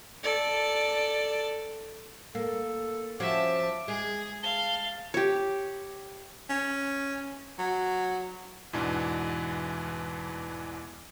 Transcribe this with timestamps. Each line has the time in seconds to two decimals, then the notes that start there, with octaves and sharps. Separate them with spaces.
0.23 A4 D5
2.35 A#3 A4
3.20 F3 C#4 F#4 E5 A5 D6
3.88 G#3 G#4
4.43 F5 A5 G7
5.14 G4 C#5
6.50 C#4
7.59 F#3
8.73 E2 G#2 B2 E3 D4